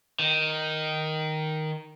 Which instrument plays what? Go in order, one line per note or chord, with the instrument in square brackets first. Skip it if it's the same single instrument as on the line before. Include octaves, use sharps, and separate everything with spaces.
[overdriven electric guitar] D#3